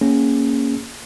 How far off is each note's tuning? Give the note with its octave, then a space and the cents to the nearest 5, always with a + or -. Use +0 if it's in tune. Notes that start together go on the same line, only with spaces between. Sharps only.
A#3 +0 C#4 +0 G#4 +0